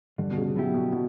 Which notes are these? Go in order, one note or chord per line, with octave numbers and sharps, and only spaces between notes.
G2 D3
B2
C#3
B2 F#3 B3 E4 G4
B2
B2